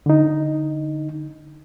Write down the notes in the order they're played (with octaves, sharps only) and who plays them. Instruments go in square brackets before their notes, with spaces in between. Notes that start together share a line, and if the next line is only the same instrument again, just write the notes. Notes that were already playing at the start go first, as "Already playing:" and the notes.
[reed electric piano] D3 D#4